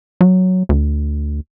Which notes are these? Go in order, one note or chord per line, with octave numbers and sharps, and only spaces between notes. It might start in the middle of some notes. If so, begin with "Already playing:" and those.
F#3
D2